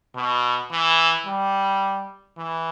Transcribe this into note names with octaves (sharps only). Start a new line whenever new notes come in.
B2
E3
G3
E3